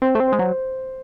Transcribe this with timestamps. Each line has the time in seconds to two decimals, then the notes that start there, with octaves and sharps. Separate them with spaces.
0.02 C4 C5
0.15 A3
0.20 C4
0.28 G#3 C5
0.39 F#3